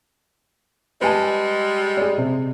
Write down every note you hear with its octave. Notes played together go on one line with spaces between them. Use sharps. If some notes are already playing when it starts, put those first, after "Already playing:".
G3 G#3 B4 G#5 A5
G#4 D5
C3